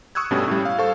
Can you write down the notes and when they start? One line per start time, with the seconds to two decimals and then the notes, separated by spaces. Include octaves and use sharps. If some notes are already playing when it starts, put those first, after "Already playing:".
0.15 C#6 D#6 E6 F#6 G#6
0.31 G2 B2 G3 A3 C#4
0.48 A2 G3
0.65 F5
0.79 A4 C5 F5 C#6